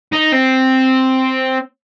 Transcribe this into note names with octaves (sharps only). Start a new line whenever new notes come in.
D#4
C4